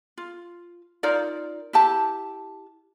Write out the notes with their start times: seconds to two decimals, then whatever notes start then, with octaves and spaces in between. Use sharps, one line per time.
0.18 F4
1.03 D#4 F4 A#4 D5
1.73 E4 G4 A5